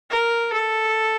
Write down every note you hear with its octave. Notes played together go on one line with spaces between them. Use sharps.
A#4
A4